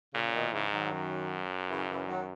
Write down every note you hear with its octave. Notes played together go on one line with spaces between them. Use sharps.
A#2 C#3
B2 D#3
G#2 C#3 E3
D#3 F#3
F#2
C#3 E3
C#3 E3
D#3 F#3